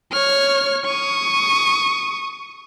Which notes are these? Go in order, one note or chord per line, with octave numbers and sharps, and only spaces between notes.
C#5 F6
C#6 D#6